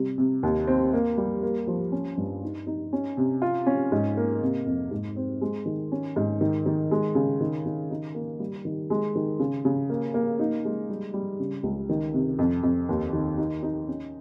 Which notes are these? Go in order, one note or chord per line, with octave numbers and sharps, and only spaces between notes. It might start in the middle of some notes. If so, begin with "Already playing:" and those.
Already playing: C3 G3
C3
D#2
C4
A#3
G3
A#3
F3
C#4
G2
D#4
D#4
C#4
C3
F4
C#4
G#2
A#3
C3
F2
G#2
C4
G#3
D#3
C#4
G#2
D#3
D#3
G#3
C#3
D#3
D#3
D#4
A#3
G3
D#3
G#3
D#3
C#3
C#3
A#3
A#3
D#4
G#3
G3
G3
C#3
C#2
D#3
C3
F2
F2
D#2
D#3
D#4
D#4
C#4